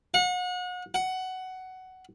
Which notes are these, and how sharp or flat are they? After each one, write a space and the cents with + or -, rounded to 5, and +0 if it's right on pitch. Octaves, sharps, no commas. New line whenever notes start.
F#5 -35
F#5 +15